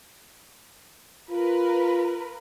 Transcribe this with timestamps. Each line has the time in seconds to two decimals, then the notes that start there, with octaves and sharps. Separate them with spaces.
1.31 F4 A#4 B4